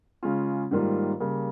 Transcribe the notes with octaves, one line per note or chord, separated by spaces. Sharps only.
C#3 G#3 C#4 F4
G#2 D#3 G3 A#3 F4
C#3 G3 A#3